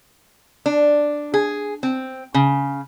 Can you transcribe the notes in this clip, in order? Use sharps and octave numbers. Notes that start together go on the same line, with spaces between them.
D4
G#4
C4
C#3